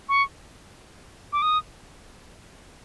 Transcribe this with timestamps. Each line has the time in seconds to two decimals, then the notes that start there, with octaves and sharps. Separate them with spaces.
0.09 C#6
1.33 D6
1.42 D#6